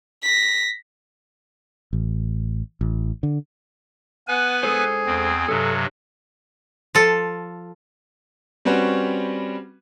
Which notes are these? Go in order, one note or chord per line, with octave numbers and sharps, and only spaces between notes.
A#6 B6
A1
A1
D3
B3 B4 F#5 G#5
G#3 G#4 A4 C5
E2 C4
G2 C3 F#3 A4
F3 A4
G3 C4 C#4 F#4 B4